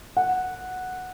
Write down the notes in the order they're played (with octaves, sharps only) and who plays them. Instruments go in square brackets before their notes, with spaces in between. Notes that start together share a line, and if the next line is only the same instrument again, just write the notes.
[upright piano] F#5